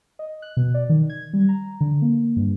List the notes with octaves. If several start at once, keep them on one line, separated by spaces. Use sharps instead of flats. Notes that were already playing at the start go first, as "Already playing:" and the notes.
D#5
F#6
B2
D5
D#3
G#6
G3
A#5
D3
A#3
G2